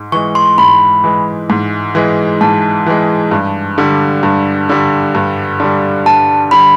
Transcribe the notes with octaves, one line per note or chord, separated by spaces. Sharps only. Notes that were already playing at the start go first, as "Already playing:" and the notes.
Already playing: G#2
E3 G#3 C#6
C6
G#2 B5
E3 G#3
G#2
E3 G#3
G#2 A5
E3 G#3
G2
D3 G3
G2
D3 G3
G2
D3 G3
G2 A5
D3 G3 B5